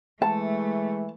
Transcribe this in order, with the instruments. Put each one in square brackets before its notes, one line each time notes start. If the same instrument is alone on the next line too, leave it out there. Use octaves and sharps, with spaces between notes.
[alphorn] E3 [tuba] G#3 [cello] A3 [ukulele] A5